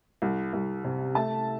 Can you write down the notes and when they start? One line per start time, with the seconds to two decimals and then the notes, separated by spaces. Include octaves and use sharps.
0.22 C2
0.53 C2
0.84 C3
1.15 A3 E5 A5